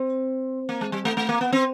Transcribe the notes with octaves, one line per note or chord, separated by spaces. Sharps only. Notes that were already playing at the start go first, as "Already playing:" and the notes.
Already playing: C4
A#3
G#3
G3
A3
A3
A#3
B3
C4